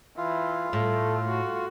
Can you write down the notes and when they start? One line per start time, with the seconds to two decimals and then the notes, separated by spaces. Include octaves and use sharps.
0.18 E3 F4
0.73 A2 A3
1.28 F#4